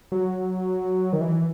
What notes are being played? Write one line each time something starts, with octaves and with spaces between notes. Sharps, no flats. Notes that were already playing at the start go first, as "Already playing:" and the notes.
F#3
D#3
E3